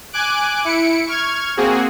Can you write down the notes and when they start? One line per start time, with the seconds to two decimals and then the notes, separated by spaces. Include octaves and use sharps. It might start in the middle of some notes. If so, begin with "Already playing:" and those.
0.13 G#5 D6 F#6 D7
0.65 E4 C#7 D7
1.07 C#6 F6 G#6
1.57 A#3 C4 F#4 G#4